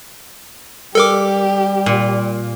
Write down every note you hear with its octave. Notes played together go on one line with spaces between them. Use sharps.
G3 G4 A4 A#4 D6
A#2